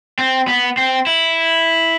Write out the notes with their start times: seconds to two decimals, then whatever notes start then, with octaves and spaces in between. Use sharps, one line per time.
0.19 C4
0.48 B3
0.77 C4
1.07 E4